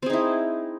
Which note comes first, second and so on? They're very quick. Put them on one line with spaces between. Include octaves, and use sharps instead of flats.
C4 G#4 D#4 E4